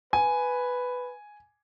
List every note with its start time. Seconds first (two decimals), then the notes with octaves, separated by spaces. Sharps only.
0.13 B4 G#5